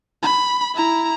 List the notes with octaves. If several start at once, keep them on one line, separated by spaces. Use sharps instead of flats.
B5
E4 A#5